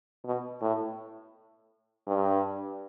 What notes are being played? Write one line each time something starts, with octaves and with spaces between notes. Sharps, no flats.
B2
A2
G2